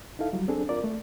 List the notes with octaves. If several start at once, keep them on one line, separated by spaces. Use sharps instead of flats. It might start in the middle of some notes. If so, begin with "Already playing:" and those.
D#4 E4 A4 F5
F#3 G3
C4 D4 G#4 A4
F4 A#4 D5
A3